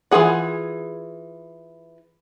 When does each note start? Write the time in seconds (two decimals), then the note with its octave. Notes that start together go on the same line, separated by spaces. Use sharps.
0.11 E3 F#3 F4 G#4 F#5